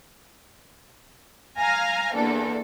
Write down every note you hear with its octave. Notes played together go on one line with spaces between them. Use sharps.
F5 G#5 A#5 F6
E2 A#3 D4 A4